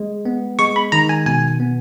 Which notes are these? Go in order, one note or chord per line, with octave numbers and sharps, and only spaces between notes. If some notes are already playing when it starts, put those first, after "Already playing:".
Already playing: G#3
B3
G#3 C#6
B5
D#3 A#5
G#5
B2 G#5
B3